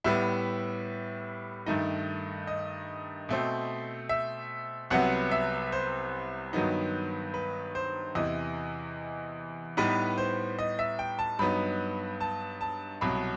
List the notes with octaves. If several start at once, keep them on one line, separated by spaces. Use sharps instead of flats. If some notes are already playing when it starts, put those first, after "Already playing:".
A2 G3 B3 E5
G2 D#3 A3 D#4 D#5
D#5
B2 A3 C4
E5
C2 C3 F#3 B3 F#5
E5
C5
G2 D#3 F#3 B3 D#4
B4
C5
E2 C3 E3 D#5
A2 G3 B3 D#4 B4
C5
D#5
E5
G5
A5
G2 F#3 B3 D#4 B5
A5
A5
C2 B2 F#3 B5